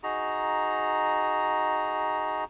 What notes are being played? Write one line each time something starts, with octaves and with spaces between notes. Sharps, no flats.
D#4 F#4 G#4 A#5